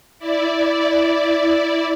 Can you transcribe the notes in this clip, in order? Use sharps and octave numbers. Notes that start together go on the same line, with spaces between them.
E4 D5